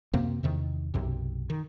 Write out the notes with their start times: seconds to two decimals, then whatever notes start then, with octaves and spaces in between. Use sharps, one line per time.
0.13 F#2 C3 A#3 C4
0.43 E2 C3 D#3
0.94 B1 F#2 C3
1.50 D#3